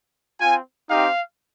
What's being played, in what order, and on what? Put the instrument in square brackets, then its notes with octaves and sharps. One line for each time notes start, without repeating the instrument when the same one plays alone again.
[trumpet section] C4 F4 G#5
C4 D#4 G4 F5